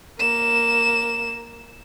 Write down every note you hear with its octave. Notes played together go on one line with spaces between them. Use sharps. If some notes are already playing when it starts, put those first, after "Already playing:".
A#3 E7